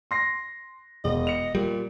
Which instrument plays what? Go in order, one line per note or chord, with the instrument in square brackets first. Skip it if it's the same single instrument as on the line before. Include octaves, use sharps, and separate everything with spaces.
[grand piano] C6 A#6 C7
[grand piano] E1 [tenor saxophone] D#5
[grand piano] C#7 F7
[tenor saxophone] A#2 [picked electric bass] G3